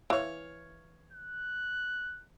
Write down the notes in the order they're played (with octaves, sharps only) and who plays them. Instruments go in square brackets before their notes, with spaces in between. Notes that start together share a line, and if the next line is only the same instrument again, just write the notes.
[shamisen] E3 [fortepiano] C#5 F5
[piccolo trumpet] F#6